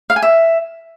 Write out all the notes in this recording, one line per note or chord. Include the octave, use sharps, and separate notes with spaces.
F5
G#5
E5